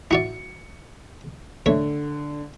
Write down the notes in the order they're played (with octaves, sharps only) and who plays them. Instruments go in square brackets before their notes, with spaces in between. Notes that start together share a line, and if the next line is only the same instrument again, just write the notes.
[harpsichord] E4 F#4 D5 [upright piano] C#7
[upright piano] D3 [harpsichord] A3 C#5